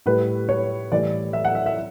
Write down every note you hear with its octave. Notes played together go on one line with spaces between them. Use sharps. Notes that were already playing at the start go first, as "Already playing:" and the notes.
A2 G3 B4
C#5
A2 E3 G3 D5
E5
F#5
E5
E5